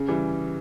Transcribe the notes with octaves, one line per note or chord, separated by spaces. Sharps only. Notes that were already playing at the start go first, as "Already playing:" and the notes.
Already playing: C#3
E3 G3